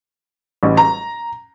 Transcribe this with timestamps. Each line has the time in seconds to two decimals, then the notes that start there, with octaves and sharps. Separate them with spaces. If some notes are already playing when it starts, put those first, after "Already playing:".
0.63 A1
0.77 A#5